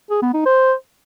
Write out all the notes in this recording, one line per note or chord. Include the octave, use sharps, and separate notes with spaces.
G#4
B3
D#4
C5